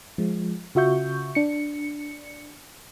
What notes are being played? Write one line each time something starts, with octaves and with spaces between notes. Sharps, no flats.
F3 G#3
C#3 F4 F#4 E5 C#6 G6
D4 C#7